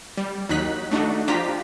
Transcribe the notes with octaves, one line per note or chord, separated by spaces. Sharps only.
G3
D#2 F#3 D#4 F#6 B6
A3 D4 D#4 F#4
F3 D4 F4 G4 A#5 B6